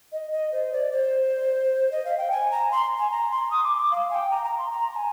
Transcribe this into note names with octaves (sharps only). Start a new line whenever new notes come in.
D#5
D#5
C5
D5
C5
D#5
F5
G5
G#5
A#5
C6
G#5
A#5
C6
D#6
D6
D6
F5
G#5
G5
A#5
A#5
C6
A#5
A#5
G#5